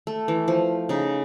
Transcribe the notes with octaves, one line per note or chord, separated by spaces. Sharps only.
A3
E3
F3
C#3 D#4